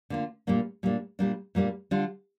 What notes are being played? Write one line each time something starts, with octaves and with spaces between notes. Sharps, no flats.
D3 A#3 F4
A#2 G3 A#3 D4
A#2 G3 A#3 D4
A#2 G3 A#3 D4
A#2 G3 A#3 D4
D3 G3 D4 F4